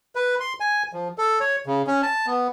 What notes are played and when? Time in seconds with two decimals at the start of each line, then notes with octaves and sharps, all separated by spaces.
0.15 B4
0.40 C6
0.60 G#5
0.93 F3
1.18 A4
1.40 C#5
1.66 C#3
1.87 C#4
2.03 A5
2.27 B3